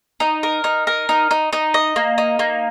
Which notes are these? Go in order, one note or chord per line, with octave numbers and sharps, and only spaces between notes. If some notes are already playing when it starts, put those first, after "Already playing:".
D#4
A#4
D#4
A#4
D#4
D#4
D#4
D#5
A#3
D#4
A#3